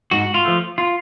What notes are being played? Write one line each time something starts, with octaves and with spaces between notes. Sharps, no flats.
G#2 F#4
F4
F3 A3
F4